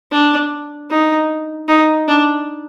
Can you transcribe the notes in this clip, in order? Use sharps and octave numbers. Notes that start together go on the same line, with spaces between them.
D4
D#4
D#4
D4